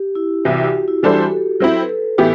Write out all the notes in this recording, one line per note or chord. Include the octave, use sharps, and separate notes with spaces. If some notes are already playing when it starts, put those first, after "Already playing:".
Already playing: G4
E4
C2 C3 E3 F#4
G4
F#4
E4
E3 G3 D4 F#4 A4 C5
G4
A4
F#3 C4 E4
B4
A4
A2 E3 B3 E4 G4